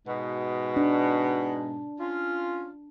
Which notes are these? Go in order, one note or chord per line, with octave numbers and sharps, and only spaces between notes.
G#2 B2
D4
C#4 F4